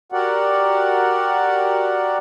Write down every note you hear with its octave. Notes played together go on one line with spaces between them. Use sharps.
F#4 G4 A#4 D5 F#5